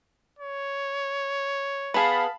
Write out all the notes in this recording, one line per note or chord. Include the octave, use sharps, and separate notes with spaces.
C#5
B3 G#4 F5 A5 B5